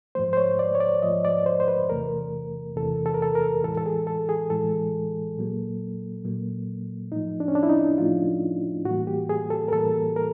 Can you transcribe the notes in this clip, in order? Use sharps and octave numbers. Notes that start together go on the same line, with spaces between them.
G#2 F3 A3 C5
C5
C#5
D5
C#5
D5
G#2 F3 A3 D#5
D5
C5
C5
B4
E2 C3 E3 A3 A#4
E2 C3 E3 A3 A4
A4
A#4
A4
A#4
A2 E3 G#3 A4
A4
G#4
A4
G#4
A2 E3 G#3 A4
A#2 F#3 A#3
A#2 F#3 A#3
A2 F3 A3 D#4
D4
C#4
D4
E4
D#4
A2 F3 A3 F4
A2 E3 G3 A#3 F#4
G4
G#4
A4
A#4
A2 E3 G3 A#3 A4
A#4